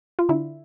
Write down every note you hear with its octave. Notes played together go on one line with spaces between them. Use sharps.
F4
D3 E4